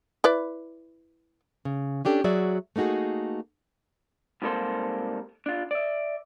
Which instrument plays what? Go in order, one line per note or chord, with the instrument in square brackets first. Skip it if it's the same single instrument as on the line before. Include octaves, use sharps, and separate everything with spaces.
[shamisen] E4 B4 D5
[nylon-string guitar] C#3
C#4 D4 G4 A4
F#3 F#4 G#4 D5 E5
A3 A#3 D#4 F#4 G#4
[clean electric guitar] G#2 C3 G3 A#3 A4 C5
D4 F4
D5 E5